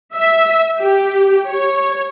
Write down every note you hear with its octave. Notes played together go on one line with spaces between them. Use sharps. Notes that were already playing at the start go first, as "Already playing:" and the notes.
E5
G4
C#5